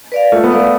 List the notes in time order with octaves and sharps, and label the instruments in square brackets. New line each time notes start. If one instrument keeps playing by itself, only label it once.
[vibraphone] B4 D5 F5
[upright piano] A3 [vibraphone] F4
[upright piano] B3
[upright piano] A3 [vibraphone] B4 D5 F5